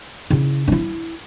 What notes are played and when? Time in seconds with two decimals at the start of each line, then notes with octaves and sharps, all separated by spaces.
0.30 C#3 E4
0.68 D#4 E4